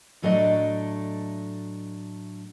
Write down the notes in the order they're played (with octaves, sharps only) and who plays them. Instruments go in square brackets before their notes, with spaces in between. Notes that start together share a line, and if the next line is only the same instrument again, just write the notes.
[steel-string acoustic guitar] A2 F#3 A3 D4 A4 D#5